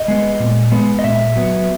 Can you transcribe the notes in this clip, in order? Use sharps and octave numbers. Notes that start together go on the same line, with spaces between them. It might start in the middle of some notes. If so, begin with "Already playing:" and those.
Already playing: D#5
G#3 B3
A#2
G#3 B3
D#5
A#2 E5
F#3 B3